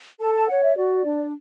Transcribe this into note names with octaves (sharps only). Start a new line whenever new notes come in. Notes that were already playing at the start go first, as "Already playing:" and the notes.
A4 A5
A5
C#5 F#5
E5
F#4 D5
D4